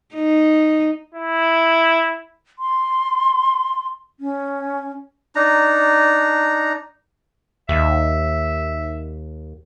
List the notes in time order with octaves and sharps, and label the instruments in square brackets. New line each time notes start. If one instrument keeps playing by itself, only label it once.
[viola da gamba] D#4
[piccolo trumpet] E4
[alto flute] C6
C#4
[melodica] D4 D#4 A#5
[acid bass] D#2 [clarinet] E5